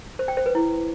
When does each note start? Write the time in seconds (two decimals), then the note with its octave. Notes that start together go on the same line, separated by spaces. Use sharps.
0.19 C5
0.28 G5
0.37 C5
0.46 B4
0.55 E4